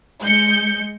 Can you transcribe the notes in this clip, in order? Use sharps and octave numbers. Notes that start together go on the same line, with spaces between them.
G#3 G6 C#7